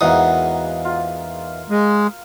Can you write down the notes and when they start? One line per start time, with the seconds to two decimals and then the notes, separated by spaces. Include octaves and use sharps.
0.01 E2 G#2 A#3 F#4 F#5 D#6
0.85 F4
1.70 G#3